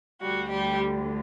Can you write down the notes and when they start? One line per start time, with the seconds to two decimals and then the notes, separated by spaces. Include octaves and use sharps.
0.22 D2 D3 G3 F#4
0.50 G3 G4